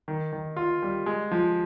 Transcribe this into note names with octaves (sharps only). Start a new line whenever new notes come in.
D#3
D#3
F4
G3
G#3
F3